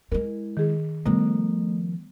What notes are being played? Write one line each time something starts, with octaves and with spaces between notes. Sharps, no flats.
G#3 E4 A#4
D#3 G#4
D#3 F3 G3 A3 B3